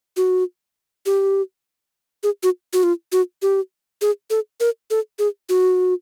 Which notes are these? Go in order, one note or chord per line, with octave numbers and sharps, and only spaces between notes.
F#4
G4
G#4
F#4
F#4
F4
F#4
G4
G#4
A4
A#4
A4
G#4
F#4